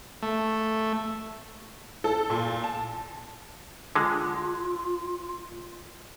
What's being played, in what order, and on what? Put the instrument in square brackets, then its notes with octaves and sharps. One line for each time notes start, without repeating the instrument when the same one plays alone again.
[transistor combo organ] A3
[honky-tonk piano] A4
A#2
A5
[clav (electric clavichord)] D3 G#3 [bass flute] F4